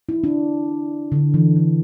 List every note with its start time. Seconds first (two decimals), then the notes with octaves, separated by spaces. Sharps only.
0.09 E4
0.24 D4
1.12 D3
1.34 E3
1.56 D3